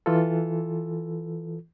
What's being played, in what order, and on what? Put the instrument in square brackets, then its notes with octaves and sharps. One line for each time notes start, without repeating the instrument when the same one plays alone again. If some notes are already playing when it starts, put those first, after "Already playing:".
[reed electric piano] E3 F4 A4